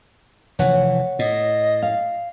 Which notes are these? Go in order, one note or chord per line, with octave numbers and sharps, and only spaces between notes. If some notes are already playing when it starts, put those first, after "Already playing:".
F1 E3 C#5 F#5
A2 D#5
F5